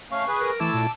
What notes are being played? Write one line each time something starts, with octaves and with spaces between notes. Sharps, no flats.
A3 C#4 F5 C#6
G#4 B4
A#4
E3 A3 E4 A5 D6 E6
A#2